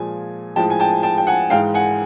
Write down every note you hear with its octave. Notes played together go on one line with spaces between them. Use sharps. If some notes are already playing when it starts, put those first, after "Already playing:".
Already playing: A#2 F3 G#3 G#5
A2 F3 G#3 G5 A5
G#5
G5 A5
G5 A5
G5
F#5 G#5
G#2 E3 G#3 F5 G5
F#5 G#5